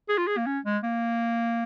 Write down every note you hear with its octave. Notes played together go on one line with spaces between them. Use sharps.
G#4
F4
G#4
A#3
C#4
G#3
A#3